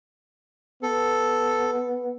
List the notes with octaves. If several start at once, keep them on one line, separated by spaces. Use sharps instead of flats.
B3 A4